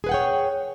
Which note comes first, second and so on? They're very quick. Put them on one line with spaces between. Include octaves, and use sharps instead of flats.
G#4 B4 F#5 G5 C#5